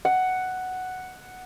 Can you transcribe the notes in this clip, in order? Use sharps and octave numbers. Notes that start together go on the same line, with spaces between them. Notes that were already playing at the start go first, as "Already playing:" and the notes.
F#5